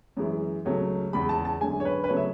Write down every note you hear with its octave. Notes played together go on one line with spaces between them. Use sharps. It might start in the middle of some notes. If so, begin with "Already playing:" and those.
F#2 E3 G#3
C#2 C#3 F#3 A3
E2 C#3 G#3 B5
A5
A5
F#2 D3 G#3 G#5
C#5
B4
B4
C#3 F#3 A3 C#5
E5